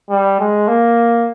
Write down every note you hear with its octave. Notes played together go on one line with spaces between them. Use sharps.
G3
G#3
A#3